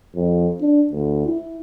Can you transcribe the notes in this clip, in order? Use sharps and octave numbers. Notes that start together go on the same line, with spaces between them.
F2
D4
D2
E4